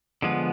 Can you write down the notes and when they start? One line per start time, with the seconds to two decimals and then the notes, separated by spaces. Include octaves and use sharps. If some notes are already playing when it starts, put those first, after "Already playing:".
0.22 D3 F3 G#3 B3